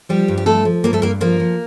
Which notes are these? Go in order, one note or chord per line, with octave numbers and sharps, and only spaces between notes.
F3 G3 G4
G2
G4
F3 A3 A4
F3
G2 A#3 A#4
A3 A4
G2 A#3 A#4
F3 A#3 A#4
F3